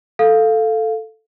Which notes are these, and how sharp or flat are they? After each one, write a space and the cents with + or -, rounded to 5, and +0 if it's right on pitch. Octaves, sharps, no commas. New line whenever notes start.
A4 +0 F5 +0